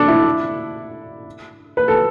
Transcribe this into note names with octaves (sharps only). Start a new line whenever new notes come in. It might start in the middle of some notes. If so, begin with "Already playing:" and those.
Already playing: D4 A4
E4
B4
A4